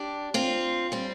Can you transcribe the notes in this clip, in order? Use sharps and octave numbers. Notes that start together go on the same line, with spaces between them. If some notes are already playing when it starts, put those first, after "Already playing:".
Already playing: D4 G4
C4 F4
G3 C4